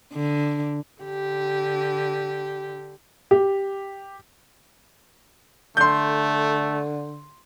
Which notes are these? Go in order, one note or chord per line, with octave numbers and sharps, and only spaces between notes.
D3
D3 G4
G4
D3 A3 C6 G6